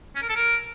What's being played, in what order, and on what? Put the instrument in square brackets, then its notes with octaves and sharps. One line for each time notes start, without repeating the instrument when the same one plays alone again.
[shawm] C#4
A#4
A4
A#4